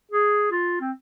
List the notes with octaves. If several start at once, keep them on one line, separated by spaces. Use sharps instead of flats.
G#4
F4
C4